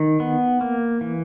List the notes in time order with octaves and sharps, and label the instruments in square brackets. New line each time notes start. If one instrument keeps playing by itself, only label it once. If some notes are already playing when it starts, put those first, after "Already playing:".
Already playing: [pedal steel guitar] D#3
B3
A#3
E3